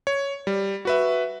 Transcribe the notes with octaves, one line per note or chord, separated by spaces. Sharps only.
C#5
G3
F#4 B4 E5